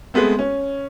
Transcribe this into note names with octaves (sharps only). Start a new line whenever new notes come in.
G#3 A3 B3 C4
C#4